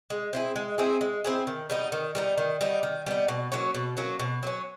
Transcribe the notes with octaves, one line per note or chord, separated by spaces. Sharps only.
G#3
C4 E4 G#4
G#3
C4 E4 G#4
G#3
C4 E4 G#4
D#3
G3 B3 D#4
D#3
G3 B3 D#4
D#3
G3 B3 D#4
D#3
G3 B3 D#4
B2
F#3 A#3 C#4
B2
F#3 A#3 C#4
B2
F#3 A#3 C#4